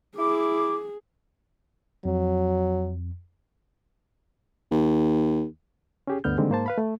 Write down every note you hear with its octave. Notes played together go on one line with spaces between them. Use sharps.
E4 G#4 D6
F2 F#3
D#2
C#4 G4 G#4
D2 G2 D3 B3 F6 G6
D3 D#3 G3 G#3 A#3 C4
G#2 A#3 C5 A5
B4 F5 B5
A3